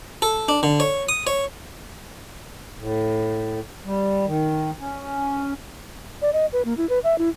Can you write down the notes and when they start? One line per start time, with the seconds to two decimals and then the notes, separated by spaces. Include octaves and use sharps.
0.22 A4
0.49 D4
0.63 D3
0.80 C#5
1.09 D#6
1.27 C#5
2.79 A2
3.85 G3
4.26 D#3
4.80 C#4
6.22 D5
6.33 D#5
6.53 B4
6.65 A#3
6.77 E4
6.89 B4
7.04 E5
7.18 E4